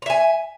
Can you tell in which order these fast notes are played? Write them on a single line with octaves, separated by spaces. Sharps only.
A#5 E5 G#5